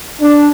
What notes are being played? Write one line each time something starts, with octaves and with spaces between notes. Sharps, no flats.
D4